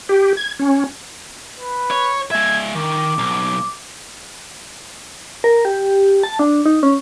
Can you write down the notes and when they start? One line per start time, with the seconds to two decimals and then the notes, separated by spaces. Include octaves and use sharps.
0.09 G4
0.37 G#6
0.59 C#4
1.59 B4
1.91 C#5
2.31 G#3 E5 G#6
2.75 D#3 D6
3.19 B1
5.44 A#4
5.65 G4
6.23 A5
6.39 D4
6.65 D#4
6.83 C#4